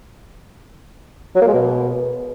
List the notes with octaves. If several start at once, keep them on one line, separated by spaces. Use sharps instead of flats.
F#3
A#3
G#3
B2